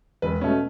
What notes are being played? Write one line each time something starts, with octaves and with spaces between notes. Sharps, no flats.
E1 B4
B2 A3 C#4